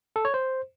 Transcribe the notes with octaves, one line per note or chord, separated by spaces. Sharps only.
A4
C#5
C5